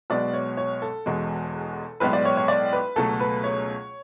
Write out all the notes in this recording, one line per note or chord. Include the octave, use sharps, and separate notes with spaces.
B1 B2 G#3 B3 D5
C#5
C#5
A4
E1 E2 B2 G#3
B1 A2 G#3 B3 B4
D5
C#5
C#5
D5
B4
C#2 B2 F#3 A3 A4
B4
C#5